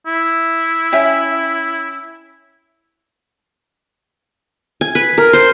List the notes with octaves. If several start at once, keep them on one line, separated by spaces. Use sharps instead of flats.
E4
C#4 E5 G5
G#5
B4
A#4
C5